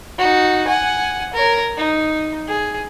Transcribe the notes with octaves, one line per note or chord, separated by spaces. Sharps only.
D#4 F#4
F#5 G#5
A#4 C#5
D#4
G#4